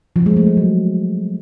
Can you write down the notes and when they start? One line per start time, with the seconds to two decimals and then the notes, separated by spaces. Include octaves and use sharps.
0.16 F3
0.26 G#3
0.36 A3
0.47 A3
0.57 F#3